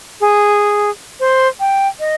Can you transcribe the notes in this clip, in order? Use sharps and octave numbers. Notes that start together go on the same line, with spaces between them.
G#4
C5
G5
D#5